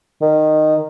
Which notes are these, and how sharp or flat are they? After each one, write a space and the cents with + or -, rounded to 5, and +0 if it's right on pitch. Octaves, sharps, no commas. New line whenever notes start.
D#3 -15